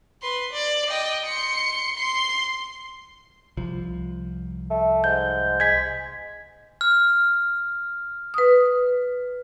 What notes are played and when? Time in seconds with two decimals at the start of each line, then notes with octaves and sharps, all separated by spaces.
0.22 B4 C6
0.53 D5
0.89 D#5 G5
1.25 C6 C#7
1.96 C6
3.57 C2 F3
4.70 A3
5.04 G#2 G6
5.60 G#3 G#6 B6
6.81 F6
8.34 B4 D#6